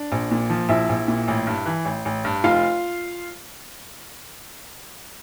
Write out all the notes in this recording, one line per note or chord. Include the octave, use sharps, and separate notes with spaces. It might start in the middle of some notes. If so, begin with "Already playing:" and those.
Already playing: D4 D5
A#1
A#2
F3
A#1 E4 E5
A#1
A#2
A1
G2
E3
A1
A1
G2
F1 F4 F5